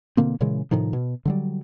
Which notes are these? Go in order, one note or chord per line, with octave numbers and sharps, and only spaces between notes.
B2 D3 A#3 C4
A#2 C#3 E3 G#3
A2 C3 D#3 F3
B2
D3 F#3 G3